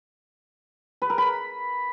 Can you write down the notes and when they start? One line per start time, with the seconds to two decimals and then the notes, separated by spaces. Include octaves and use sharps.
1.02 B4
1.10 A#4
1.18 B5